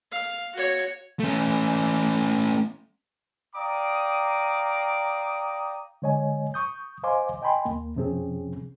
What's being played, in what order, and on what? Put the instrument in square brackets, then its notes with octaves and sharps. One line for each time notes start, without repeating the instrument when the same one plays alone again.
[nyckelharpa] F5
F#4 C#5
[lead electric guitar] A3 C#4
[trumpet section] D5 F5 G5 A#5 D6 D#6
[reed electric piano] D3 G#3 C#5 D#5 G#5
C#6 D#6 G6
C5 D#5 F5 G#5 C6 D6
D#5 G5 G#5 B5 C6
D#2 A#3
F2 C3 F3 C4 C#4 G#4